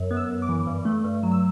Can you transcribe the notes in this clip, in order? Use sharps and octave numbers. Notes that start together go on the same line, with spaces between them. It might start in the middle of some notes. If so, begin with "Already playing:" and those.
Already playing: F#2
B3
E6
F#2
D6
E3
G2
A3
G2
F#3
E6